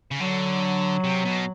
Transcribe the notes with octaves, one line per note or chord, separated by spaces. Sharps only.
C#3
D3 F#3
C3
B2